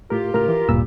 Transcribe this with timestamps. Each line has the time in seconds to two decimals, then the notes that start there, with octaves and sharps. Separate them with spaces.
0.10 A2 F4 G4 A#4
0.34 A2 C#3 A#4 F6
0.48 E3
0.69 D1 G2 A#2 E6